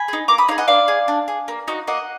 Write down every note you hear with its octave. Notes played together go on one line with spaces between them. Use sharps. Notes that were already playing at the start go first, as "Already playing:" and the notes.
Already playing: G#5 B5
D#4 G#4
A#3 A#5 D6
B5 D#6
D#4 G#4 D5 F5
D#5 F#5
D4 D5 F5
G#4
D4
G#4
A#3
D#4 F#4
A#3 D#5 F#5